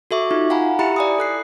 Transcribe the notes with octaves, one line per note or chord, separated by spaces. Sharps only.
F#4 A4 E5 C#6 D6
D#4 F4
F5 F#5 G#5 A#5 B5
E4 G4 E5 A#5 B5 C#7
D5 G#5 D#6
A4 F#6 C7